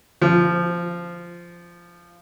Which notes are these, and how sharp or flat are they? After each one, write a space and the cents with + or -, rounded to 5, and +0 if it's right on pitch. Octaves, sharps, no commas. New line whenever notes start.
F3 -10